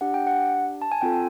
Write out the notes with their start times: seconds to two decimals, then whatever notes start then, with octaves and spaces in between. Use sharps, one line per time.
0.01 D4 G4 F#5
0.14 G5
0.27 F#5
0.82 A5
0.92 G#5
1.01 C4 F4 A4 G5